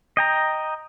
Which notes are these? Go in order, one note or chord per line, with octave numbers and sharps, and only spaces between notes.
D#5 G5 A#5